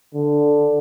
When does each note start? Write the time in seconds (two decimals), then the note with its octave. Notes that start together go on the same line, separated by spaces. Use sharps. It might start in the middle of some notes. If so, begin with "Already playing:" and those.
0.14 D3